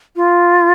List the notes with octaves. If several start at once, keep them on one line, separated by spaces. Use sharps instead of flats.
F4